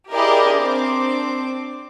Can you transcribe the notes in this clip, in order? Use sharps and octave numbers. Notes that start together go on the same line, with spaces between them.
E4 G4 G#4 A#4 D5 D#5
C4 D4 D6